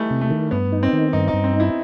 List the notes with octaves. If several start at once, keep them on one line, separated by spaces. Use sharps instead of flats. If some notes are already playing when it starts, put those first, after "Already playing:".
Already playing: E3 G3 A3 D#4
C3
A3
D#3
G2 B3
D#4
C4
D#3
G2 D#4
D#4
G2
C4
D#4
E4